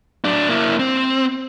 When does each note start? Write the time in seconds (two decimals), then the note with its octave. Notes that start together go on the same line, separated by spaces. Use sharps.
0.24 F#3 D4
0.49 A#3 E4
0.79 C4